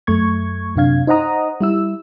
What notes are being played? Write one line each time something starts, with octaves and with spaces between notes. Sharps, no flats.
F#2 A3 C#6 G#6
F#2 C3 D4 F5 G#6
D#4 C5 D#5 F#5 A#5 D#6
G3 E4 E6